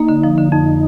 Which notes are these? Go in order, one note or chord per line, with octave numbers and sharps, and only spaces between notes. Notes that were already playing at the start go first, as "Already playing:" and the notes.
Already playing: A#3 D#4
D3
F3
D3
F2 D#4